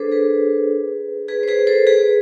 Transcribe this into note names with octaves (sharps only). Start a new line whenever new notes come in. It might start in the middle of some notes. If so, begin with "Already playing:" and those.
Already playing: D4 G#4 A4 B4 C5
G#4 B4
G#4 B4
C5
G#4 B4
A4 C5
G#4 B4